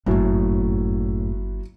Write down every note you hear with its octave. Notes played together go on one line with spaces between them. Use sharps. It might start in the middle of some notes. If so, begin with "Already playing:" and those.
G1 F#2 A2 F#3 A#3 E4 F#4